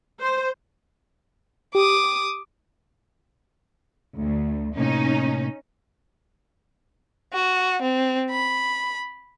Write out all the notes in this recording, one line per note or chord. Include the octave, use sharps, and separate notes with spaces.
C5
G4 D6 D#6
D2
A2 C3 A#3 C#4 D#4
F#4
C4
B5